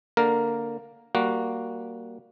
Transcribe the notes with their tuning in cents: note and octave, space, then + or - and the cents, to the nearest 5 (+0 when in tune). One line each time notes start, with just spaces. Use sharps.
D3 +0 A#3 +0 A#4 +0
G3 -15 A#3 +0 F#4 -5